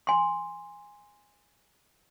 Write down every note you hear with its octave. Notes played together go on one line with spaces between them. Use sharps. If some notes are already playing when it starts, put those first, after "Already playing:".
G#5 C6